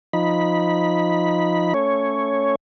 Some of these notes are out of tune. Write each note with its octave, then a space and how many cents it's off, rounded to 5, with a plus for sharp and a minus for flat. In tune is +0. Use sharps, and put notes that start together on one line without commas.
F3 +0 D#4 +0 B5 -10
A3 +10 C#4 +5 C#5 +0